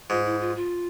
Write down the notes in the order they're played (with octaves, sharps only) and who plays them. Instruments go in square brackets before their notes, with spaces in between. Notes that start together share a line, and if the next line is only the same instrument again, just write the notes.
[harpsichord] G#2 [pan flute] F4
[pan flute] E4
F4
F4